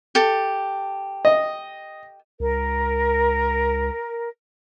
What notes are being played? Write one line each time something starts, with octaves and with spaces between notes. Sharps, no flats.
G4 A4
D#5
C#2 A#4